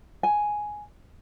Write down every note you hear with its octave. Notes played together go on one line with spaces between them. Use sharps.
G#5